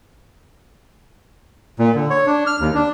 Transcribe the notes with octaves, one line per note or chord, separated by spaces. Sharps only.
A#2
D3
C#5
D4
F6
D#2
D4